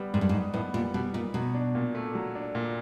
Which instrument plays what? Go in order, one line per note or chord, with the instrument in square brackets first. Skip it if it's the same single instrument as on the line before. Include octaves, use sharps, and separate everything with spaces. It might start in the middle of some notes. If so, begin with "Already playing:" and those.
Already playing: [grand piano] G3 B3
[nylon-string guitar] G#2 [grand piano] G3
[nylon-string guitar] G2
G#2
[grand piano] D#4
[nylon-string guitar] A2 [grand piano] B3
[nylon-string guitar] A#2 [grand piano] G3
[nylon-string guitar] B2 [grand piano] G3
[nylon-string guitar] A#2 [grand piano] D#4
[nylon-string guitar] B2 [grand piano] F#3
[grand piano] D4
A#2
A3
F#3
D4
A#2